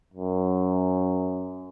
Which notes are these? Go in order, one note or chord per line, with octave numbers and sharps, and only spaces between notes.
F#2